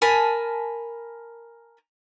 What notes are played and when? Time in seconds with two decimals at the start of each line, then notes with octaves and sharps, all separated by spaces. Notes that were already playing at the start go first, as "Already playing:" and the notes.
0.02 A#4 G#5 A5 B5